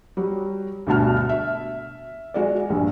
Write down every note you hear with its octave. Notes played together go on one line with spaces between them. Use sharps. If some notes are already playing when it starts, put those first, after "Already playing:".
F#3 G3
D2 G2 B2 F#4 A5 F6
E5
G#3 F#4 D5
A#1 G2